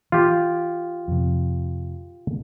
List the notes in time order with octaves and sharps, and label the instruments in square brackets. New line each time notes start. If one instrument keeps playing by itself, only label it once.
[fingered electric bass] E3 [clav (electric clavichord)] F4 G4
[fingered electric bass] F2 C3